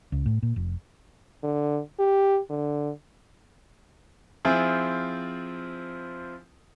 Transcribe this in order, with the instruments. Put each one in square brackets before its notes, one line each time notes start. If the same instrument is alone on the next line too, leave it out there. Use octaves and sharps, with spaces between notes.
[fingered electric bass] C#2
A2
A#2
F1
[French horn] D3
G4
D3
[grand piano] F3 C4 E4 F4 G#4